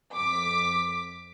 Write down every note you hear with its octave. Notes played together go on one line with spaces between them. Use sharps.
F2 D6 B6